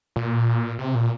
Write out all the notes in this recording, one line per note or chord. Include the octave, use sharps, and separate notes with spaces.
A#2
C3
A#2